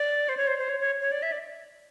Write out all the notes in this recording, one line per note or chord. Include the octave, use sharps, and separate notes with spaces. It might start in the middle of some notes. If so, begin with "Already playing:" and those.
Already playing: D5
C5
C#5
C5
C5
C#5
C#5
C#5
D5
E5
D5